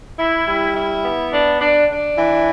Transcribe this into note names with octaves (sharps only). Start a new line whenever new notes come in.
E4
G3
E4
B3
D4
D4
D4
E3